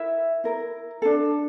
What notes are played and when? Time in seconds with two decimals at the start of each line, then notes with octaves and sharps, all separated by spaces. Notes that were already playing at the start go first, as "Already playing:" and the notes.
Already playing: E4 A#4 E5
0.44 E4 A#4
1.02 D4 A4